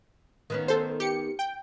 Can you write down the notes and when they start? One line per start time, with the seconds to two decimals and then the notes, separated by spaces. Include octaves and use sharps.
0.50 D#3 B3 C#4
0.68 A4 C5
1.00 G4 C#7
1.39 G5